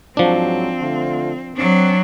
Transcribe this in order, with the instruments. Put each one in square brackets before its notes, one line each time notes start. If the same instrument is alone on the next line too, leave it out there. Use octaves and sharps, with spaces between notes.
[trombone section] G#2 F#3 [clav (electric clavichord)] F3 D4 [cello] C4
[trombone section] D3 A3 F4
[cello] F#3 D4 [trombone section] C4